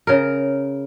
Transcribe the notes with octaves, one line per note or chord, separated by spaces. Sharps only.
C#3 A#4